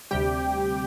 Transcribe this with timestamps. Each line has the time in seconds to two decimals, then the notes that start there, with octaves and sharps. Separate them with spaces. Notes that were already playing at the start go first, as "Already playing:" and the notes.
0.11 D2 C3 G3 G4 G5